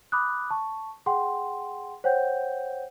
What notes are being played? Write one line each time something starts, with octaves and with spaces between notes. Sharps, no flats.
B5 D6 D#6 F#6
A5 C#6
G#4 F#5 G5 C6
C5 C#5 F#5 G5 G6